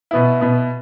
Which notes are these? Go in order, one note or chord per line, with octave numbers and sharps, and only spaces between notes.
B2 B3 E4
B2 B3 E4